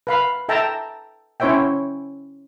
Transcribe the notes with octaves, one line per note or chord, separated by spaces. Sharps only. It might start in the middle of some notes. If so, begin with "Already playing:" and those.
B4 F5 B5
A4 E5 G5 A5 A#5
C#4 E4 C5 C#5 E5 G5